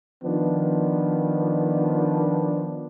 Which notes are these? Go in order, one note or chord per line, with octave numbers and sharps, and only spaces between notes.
D#3 F3 B3 D4